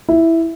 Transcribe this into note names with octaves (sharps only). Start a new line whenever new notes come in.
E4